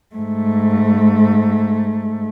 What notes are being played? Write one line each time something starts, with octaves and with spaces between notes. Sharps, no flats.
G#2 A3